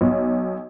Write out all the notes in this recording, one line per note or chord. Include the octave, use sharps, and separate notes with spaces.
B1